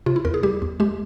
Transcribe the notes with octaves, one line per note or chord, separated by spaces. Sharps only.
C3 F4
E4
E2 A#4
G#4
G3 G4
E2
G#3 G4